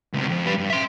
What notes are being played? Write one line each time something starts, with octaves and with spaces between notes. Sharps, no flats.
C#2 C3
F2 F3
G3 B4
G2
E5 C6